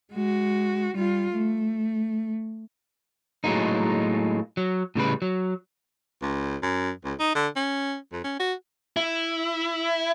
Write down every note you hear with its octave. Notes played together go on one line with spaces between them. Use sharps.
G#3 F#4
G3 F4
A3
A2 F#3 G#3 A#3 D#4
F#3
A2 C#3 G3 B4
F#3
C#2
F#2
C#2
D#4
D3
C#4
F2
C#4
F#4
E4